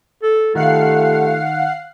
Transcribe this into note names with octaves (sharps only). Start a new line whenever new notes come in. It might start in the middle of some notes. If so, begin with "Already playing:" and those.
A4
D#3 A3 F4 G4 A4 F5 F#5 C7